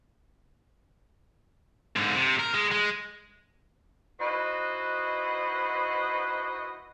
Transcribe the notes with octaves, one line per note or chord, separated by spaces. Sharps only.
G#2 D3
C3
A#4
G#3
G#3
D#4 E4 F#4 B4 C5 D#5